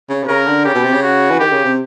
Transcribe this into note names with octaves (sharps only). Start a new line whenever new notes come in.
C#3
C3
C#3 A#4
D3
C#3 G4
B2
C3
C#3
F#4
E3
D#3 G4
C#3
C3